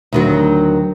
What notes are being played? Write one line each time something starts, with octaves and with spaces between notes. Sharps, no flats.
D2 D#3 F#3